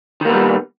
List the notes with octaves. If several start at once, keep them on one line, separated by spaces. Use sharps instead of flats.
D#3 G3 A#3 B3